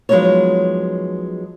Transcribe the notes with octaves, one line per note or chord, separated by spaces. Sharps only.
F3 F#3 G#3 B3 D#4 C#5